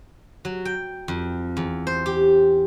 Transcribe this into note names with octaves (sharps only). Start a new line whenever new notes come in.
F#3
G5
F2
E2
C5
G4